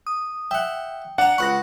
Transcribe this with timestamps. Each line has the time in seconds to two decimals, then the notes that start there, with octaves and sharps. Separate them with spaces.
0.07 D#6
0.51 E5 F#5 G5
1.18 D4 F#5 A#5
1.38 C#2 B5 C#6 F#6 A#6